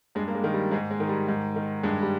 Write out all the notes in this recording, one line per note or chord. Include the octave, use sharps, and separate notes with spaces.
G2 G#3
A#3
G#3
D#3
G3
G#2 G#3
G#3
D#3
G3
G#2
D#3
G2 G#3
G3